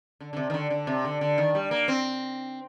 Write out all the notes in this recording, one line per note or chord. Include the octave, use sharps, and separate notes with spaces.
D3
D3
C3
D#3
D3
D3
C3
D3
D3
D#3
G3
A#3
C4